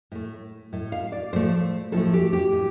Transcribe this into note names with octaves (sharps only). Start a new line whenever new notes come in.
A2 A3
A2 A3
F5
D5
A2 F3 A3 C5
A2 F3 A3 A4
G4
G4
A2